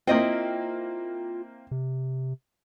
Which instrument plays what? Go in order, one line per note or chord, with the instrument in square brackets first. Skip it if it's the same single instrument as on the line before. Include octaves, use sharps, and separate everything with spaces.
[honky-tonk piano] A#3 C4 [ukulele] E4 D#5 G5 [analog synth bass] F4
[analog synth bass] C3